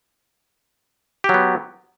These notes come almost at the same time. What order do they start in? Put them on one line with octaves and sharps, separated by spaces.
G4 F#3 B3